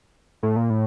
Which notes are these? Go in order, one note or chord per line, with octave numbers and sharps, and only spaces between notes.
A2
A#2
A2